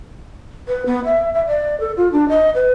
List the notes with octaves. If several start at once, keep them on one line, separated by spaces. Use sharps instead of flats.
B4
B3
E5
E5
D5
A4
F4
D4
D#5
B4